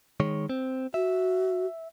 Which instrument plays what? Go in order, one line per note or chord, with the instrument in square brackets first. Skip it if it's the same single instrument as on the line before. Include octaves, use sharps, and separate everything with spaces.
[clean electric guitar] D#3 G#3 C#5
C4
[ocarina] F#4 [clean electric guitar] E5